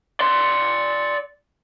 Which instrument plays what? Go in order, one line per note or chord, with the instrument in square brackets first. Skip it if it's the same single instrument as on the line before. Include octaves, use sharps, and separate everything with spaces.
[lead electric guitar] D5 C6